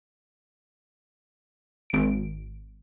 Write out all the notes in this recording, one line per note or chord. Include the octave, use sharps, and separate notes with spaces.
G#1 D7